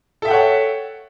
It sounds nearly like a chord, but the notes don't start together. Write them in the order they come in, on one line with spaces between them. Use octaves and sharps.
A4 E5 G5 F#5 C#5